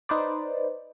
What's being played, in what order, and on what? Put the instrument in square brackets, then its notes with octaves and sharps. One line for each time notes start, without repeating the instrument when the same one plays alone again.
[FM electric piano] D#4 B4 C5 D5